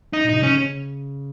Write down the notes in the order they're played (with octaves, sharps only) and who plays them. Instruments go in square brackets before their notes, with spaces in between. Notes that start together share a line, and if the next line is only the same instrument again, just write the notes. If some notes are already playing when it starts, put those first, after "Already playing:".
[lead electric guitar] D#4
[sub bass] A#2
[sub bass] C3 [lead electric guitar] D#4
[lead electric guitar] C#4
[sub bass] C#3